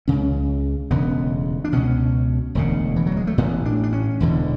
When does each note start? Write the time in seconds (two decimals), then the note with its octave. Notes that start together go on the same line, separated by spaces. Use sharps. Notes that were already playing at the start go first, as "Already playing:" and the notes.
0.08 C#2 C#3 C#4
0.91 E1 D2 C#3 B3
1.65 D4
1.73 C#2 B2 C#4
2.55 E1 D2 C#3
2.96 E3
3.07 F#3
3.17 G#3
3.27 A3
3.38 A1 A2 B3
3.65 D4
3.83 D4
3.93 C#4
4.20 E1 E2 D3